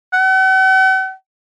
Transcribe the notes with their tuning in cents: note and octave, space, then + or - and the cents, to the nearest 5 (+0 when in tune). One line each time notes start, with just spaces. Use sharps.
F#5 +45